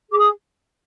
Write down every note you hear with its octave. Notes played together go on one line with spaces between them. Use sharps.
G#4 D6
D#6